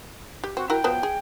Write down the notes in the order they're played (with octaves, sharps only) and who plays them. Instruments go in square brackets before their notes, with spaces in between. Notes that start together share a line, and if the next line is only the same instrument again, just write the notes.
[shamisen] G4
[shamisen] C4 [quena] F#4
[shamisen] E4 F#4 A#4 [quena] G5
[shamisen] F3 F#3 B3
G#4